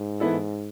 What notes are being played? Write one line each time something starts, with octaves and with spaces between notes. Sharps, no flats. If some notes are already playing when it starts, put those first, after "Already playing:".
Already playing: G#2
E3 B3 E4 A4